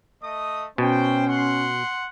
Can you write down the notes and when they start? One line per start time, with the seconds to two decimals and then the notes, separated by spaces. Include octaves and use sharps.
0.22 A3 D#5 D#6
0.78 B2 C#4 C5 G5
1.27 F#5 C6